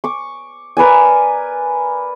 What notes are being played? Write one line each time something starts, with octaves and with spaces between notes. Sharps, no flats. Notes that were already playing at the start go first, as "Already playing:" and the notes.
C#6 D6
A#4 B4 D5 G#5